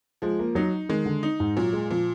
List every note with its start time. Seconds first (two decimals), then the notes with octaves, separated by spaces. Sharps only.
0.22 F3 G#3
0.39 A#3
0.55 F#3 D#4
0.89 D#3 G#3
1.06 D3
1.23 D#4
1.40 G#2
1.56 A#2 F#3
1.73 G#3
1.90 A#2 F3